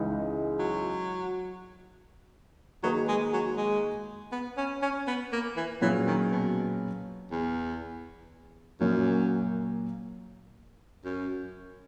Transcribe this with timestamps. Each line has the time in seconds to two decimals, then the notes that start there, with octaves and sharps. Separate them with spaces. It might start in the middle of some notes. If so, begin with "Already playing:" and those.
Already playing: C#2 C#3 E3 G#3 D#4
0.59 F#3
2.83 D#3 F#3 A#3 D#4 G#4 B4
3.08 G#3
3.33 F#3
3.57 G#3
4.32 B3
4.57 C#4
4.82 C#4
5.07 B3
5.32 A#3
5.57 E3
5.82 A#2 E3 F#3 C#4 G#4
6.07 D#3
6.32 B2
7.31 E2
8.80 F#2 A#2 F#3 A#3
11.05 F#2